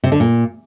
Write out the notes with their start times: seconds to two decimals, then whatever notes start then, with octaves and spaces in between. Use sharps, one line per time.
0.04 C3
0.12 D3
0.20 A#2